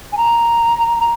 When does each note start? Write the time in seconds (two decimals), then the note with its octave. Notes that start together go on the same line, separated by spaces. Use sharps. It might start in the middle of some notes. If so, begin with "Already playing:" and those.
0.12 G#5
0.17 A#5
1.00 A#5